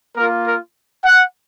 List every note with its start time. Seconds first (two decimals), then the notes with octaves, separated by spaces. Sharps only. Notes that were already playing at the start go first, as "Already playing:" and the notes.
0.17 A#3 F4 A#4
0.46 A#4
1.04 F#5